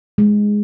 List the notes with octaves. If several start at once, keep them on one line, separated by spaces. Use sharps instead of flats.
G#3